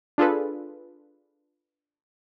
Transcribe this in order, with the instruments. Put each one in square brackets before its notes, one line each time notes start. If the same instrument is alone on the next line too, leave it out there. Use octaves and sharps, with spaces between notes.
[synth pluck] D4 F4 G#4 A4 B4